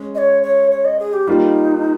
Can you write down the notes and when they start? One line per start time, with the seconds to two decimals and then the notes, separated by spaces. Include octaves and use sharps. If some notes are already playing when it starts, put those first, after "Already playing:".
Already playing: G#3 C#4
0.15 D#5
0.18 C#5
0.43 C#5
0.71 C#5
0.85 D#5
0.99 G#4
1.13 G4
1.27 G3 A#3 D#4 F4